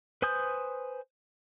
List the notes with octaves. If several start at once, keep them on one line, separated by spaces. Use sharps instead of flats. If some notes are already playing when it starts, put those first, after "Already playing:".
B4 C5 G#5 D#6 G6